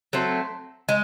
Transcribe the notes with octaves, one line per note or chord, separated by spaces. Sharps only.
F#3 A3 C4
G#3